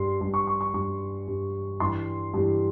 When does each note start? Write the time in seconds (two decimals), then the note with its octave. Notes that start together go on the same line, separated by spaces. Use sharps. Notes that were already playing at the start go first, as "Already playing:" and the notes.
Already playing: G2 G3 C6
0.21 G2 G3
0.34 C#6
0.47 C#6
0.61 C#6
0.74 G2 G3 C#6
1.27 G2 G3
1.80 G2 E3 G3 C6
2.34 G2 E3 G3